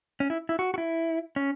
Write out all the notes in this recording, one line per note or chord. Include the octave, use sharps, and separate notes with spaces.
C#4
E4
E4
F#4
F#4
E4
C#4